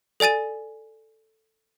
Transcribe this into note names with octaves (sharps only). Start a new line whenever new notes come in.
A4 D5 G#5 A6 D#7